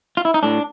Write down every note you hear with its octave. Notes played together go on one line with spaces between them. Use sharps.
F4
E4
D#4
A2 D4